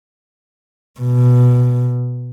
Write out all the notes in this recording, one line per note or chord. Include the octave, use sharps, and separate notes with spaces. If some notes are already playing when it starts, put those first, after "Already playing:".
B2